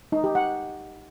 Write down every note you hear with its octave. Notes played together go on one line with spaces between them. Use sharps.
D#4
G4
F#5